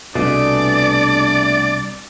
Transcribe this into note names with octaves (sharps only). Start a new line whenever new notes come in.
C2 B2 A3 B3 D4 G#4 D5